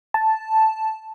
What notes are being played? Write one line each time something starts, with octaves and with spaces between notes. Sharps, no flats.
A5